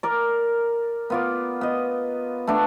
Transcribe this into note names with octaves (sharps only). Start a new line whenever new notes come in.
A#4 D5
B3 F4 D5
B3 D#5
A3 B3 D4